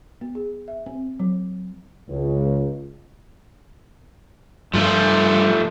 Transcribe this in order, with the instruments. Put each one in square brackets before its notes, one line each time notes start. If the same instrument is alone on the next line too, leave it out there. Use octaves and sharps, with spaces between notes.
[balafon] B3
G#4
E5
C4
F#3
[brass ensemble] C#2
[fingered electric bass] G2 G3 [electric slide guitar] F3 A3 F4